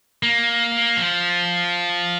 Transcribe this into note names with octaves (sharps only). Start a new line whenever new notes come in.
A#3
F3